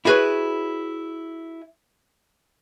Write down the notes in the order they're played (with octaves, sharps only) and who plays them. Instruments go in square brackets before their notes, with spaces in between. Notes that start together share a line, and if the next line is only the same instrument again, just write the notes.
[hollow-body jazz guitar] E4 F#4 G#4 A#4 B4 C#5